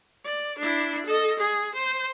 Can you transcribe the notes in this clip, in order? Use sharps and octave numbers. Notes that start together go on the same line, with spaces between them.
D5
D4 E4
A4 D#5
G#4
C5